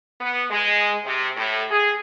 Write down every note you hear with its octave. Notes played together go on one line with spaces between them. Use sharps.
B3
G#3
C3
A2
G#4